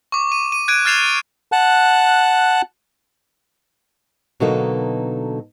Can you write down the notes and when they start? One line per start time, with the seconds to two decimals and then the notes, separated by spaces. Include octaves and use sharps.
0.12 C#6 D6
0.32 D#7
0.52 D#7
0.68 F#6 G#6 D7 D#7
0.85 F6 G#6 A6 C7 E7 F7
1.52 F#5 A5 F#6
4.40 B2 D3 F#3 A#3 D#4 A4